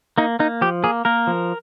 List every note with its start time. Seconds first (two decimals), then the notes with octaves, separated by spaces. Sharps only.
0.18 A#3 D#4
0.39 A#3 D#4
0.61 F3 G4
0.84 A#3 G#4
1.05 A#3 A#4
1.27 F3